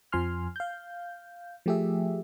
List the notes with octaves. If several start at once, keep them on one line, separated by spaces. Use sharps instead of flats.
F2 F3 G#5 C6 F6
F5 G6
F3 A3 G4 G#4 E5